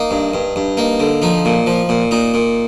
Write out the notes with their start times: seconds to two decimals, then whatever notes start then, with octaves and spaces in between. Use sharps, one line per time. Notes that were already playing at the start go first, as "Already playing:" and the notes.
Already playing: A#3 D#4
0.11 G2
0.34 G2
0.56 G2
0.77 A#3 D#4
1.00 D3
1.22 F3 D#4
1.45 A#2
1.67 F3
1.89 A#2
2.11 A#2 D#4
2.34 A#2